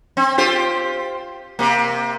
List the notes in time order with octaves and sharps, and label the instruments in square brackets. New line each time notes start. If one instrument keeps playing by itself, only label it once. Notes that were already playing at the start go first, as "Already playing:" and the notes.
[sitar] C4
F4 G4 C5
C3 A#3